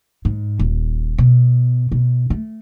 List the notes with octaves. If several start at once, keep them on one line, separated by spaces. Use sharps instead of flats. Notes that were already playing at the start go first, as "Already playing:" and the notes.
G#2
D#1
B2
B2
A3